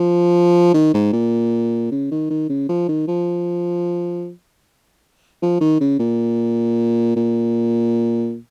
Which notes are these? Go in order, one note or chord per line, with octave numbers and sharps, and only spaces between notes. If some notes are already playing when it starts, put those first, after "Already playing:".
Already playing: F3
D#3
G#2
A#2
C#3
D#3
D#3
C#3
F3
D#3
F3
F3
D#3
C#3
A#2
A#2